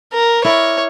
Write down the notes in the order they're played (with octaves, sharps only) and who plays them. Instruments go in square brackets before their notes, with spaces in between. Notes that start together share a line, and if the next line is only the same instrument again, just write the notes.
[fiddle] A#4
[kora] E4 A#4 D5 [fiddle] C#5